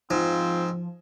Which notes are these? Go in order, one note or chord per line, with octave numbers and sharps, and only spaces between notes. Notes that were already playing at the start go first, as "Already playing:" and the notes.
G#2 F3 C4 F4